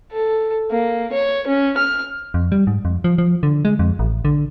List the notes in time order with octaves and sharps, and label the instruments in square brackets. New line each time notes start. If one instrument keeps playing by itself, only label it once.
[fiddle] A4
A#3
C#5
C#4
F6
[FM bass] F2
G3
G#2
F2
F3
F3
D3
G#3
F2
A1
D3